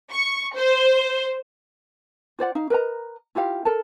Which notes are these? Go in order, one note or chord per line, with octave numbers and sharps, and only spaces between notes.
C#6
C5
F4 C5 D5 F#5
D#4 F5
A#4 B4 D#5 A#5
E4 F4 G4 F5
A4 A#4 A5